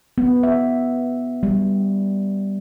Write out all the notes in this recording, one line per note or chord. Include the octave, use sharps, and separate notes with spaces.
B3
E5
G3